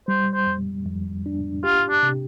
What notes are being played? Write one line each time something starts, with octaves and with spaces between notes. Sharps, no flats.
G3 C5
C5
F2
F2
D4
F4 G4
D4
C3